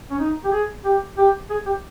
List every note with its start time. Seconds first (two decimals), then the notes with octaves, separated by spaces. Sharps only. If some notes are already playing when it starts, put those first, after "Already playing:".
0.11 C#4
0.19 D#4
0.45 G4
0.52 G#4
0.85 G4
1.18 G4
1.50 G#4
1.66 G4